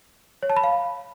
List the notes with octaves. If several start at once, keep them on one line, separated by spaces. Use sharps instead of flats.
C#5
A5
B5
F5